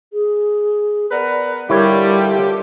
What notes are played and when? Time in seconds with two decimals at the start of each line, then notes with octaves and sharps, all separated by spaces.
0.13 G#4
1.11 B3 A#4 B4 D5
1.70 D3 G3 E4 F4 G4 A#4 C#5